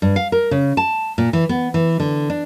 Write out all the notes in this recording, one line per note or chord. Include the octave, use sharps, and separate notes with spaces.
G2
F5
A#4
C#3
A5
A#2
E3
B3
E3
D3
D4